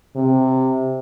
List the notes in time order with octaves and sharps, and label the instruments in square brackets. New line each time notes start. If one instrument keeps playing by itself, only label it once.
[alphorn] C3